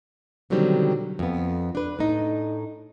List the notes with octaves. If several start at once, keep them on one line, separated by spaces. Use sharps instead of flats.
B2 D3 D#3 F#3 G3 C4
F2 B3
D4 B4
A2 D#4